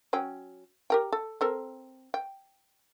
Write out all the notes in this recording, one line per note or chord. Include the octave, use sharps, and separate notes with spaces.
F#3 C#4 G5
G4 A#4 G5
A4
C4 A4 A#4
G5